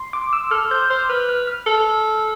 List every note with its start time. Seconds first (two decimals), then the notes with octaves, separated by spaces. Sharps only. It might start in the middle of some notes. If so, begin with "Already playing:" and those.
Already playing: C6
0.13 D6
0.33 E6
0.51 A4 F6
0.71 C5 G6
0.90 C5 F6
1.09 B4 F6
1.29 F6
1.47 F6
1.67 A4 F6